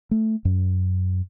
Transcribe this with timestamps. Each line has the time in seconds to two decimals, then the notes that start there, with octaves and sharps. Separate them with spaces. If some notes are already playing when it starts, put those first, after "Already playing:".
0.11 A3
0.45 F#2